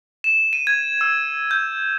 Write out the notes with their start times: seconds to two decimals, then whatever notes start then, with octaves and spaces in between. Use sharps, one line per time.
0.24 E7
0.53 D#7
0.67 G#6
1.01 E6
1.51 G6